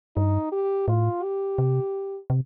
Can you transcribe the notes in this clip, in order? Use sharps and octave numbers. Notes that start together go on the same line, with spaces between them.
G2 D#4
G4
A2 F4
G4
C3
C3